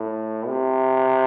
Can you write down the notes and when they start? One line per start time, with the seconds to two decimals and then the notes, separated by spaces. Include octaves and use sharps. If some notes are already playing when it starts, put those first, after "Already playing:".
Already playing: A2
0.47 C3